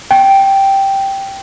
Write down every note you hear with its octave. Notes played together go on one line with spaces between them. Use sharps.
G5